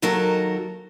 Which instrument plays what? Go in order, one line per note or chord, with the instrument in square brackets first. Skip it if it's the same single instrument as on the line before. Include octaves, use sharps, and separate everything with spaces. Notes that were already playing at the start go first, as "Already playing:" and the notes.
[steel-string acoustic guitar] D#2 D#3 F#3 A4 A#4